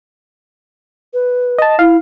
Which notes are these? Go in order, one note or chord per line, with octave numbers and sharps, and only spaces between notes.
B4
D#5 A5
E4 F5